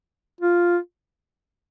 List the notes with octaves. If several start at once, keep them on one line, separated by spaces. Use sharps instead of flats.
F4